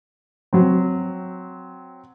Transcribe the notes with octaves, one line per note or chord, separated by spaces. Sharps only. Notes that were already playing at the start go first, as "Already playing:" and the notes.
F#3 C4